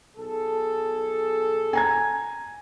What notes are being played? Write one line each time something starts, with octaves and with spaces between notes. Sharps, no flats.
B1 G#4 A4
G#5 A#5 G#6